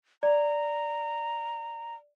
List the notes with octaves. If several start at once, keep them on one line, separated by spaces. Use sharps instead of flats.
D5 A#5